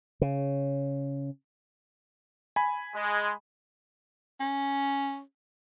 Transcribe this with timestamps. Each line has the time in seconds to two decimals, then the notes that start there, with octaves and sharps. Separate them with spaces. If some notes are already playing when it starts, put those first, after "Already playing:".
0.22 C#3
2.56 G#5 B5
2.96 G#3
4.40 C#4